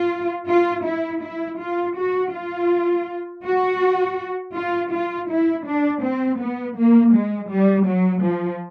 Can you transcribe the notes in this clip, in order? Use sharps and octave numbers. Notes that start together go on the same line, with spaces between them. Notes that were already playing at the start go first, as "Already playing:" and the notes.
Already playing: F4
F4
E4
E4
F4
F#4
F4
F#4
F4
F4
E4
D4
C4
B3
A#3
G#3
G3
F#3
F3